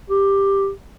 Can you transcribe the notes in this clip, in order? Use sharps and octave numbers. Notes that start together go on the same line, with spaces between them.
G4